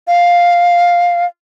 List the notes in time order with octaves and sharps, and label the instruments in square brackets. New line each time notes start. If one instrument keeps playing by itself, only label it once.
[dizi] F5